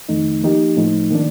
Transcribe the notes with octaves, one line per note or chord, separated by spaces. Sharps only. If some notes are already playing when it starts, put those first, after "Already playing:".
F2 D#3 A3 D#4
F3 A#3 D#4 G4
A2 F3 A3 D#4
D#3 A#3 D4